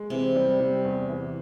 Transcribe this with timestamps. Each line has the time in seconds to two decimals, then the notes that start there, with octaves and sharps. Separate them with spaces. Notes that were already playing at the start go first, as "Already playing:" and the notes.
Already playing: G#3
0.10 C3 E3
0.36 G3
0.60 G3
0.85 E2
1.09 E3